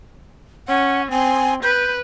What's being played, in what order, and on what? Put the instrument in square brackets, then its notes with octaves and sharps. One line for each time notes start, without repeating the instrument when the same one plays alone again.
[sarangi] C#4 [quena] F#5
[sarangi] C4 [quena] G#5
[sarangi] B4 [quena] G6